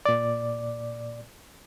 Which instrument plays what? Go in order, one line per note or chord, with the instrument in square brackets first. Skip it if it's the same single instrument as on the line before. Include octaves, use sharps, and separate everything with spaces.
[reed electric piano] A#2 D5